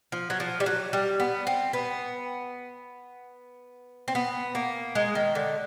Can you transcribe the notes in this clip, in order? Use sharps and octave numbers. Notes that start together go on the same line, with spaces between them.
F3
F#3
F3
G3
F#3
G3
B3
C4
B3
C4
B3
A#3
G#3
D#3
D3